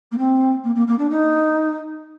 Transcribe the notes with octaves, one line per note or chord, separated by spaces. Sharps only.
A#3
C4
A#3
A#3
A#3
D4
D#4